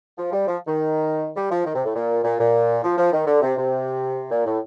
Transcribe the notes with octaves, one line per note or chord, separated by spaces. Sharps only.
F3
G3
F3
D#3
G3
F3
D#3
C3
A2
A#2
A#2
A#2
F3
F3
D#3
D3
C3
C3
A#2
A2